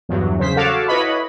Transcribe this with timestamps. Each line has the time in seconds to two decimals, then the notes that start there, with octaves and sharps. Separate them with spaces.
0.09 E2 G2 F#3
0.39 C#3 C5 B6
0.56 F#4 A4 C#5 F5 A5 D6
0.88 E4 B4 C#5 D#5 B5